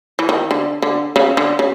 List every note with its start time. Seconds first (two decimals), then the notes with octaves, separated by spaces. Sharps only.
0.19 E3
0.29 D#3
0.51 D3
0.82 D3
1.16 C#3
1.37 D3
1.59 C#3